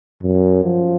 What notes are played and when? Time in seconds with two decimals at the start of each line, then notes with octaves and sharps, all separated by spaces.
0.23 F#2
0.65 F3